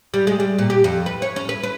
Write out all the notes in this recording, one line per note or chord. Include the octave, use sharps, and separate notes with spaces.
G3
G#3
G3
A#2
G4
F2
B4
C#5
C#4
B4
B4